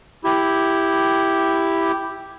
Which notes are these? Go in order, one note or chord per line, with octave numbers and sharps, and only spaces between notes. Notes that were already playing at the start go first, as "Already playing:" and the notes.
E4 G4